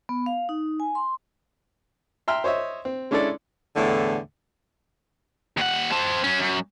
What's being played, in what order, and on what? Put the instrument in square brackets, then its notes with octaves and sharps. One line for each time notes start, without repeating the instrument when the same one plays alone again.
[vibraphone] B3
F5
D#4
G#5
C6
[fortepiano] E5 G5 A#5 C6 E6 F6
C5 C#5 D#5 E5
C4
G#3 C#4 D4 E4 A4 D5
[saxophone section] E2 A2 D3 E4
[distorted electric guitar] D#2 F#5
C4 A5
F#3 C#4
F#2